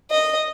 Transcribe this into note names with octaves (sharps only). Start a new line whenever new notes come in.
D#5